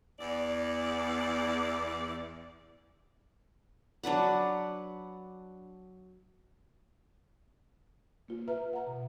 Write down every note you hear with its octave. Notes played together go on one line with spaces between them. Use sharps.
E2 D5
F#3 D4 B4 F#5
A#3 F4
B4 E5 A#5 F6
F#5 A#5
B2